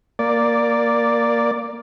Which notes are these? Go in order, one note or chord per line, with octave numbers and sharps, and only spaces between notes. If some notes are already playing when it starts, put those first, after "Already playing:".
A#3 D5